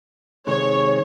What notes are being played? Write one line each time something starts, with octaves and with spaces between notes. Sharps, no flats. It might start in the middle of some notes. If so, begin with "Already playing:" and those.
C3 D#3 G#3 C#5